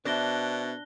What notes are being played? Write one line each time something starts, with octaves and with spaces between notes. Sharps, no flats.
B2 D4 A#4 C5 E5 F#6 A#6 G7